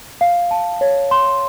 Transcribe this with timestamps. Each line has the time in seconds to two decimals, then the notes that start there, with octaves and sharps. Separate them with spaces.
0.21 F5
0.51 A5
0.81 C#5
1.11 C6